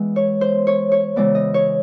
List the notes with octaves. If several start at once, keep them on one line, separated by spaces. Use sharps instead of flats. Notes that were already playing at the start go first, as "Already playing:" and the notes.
Already playing: E3 G#3 B3
C#5
C5
C#5
C#5
C#3 E3 G#3 B3 D5
D#5
C#5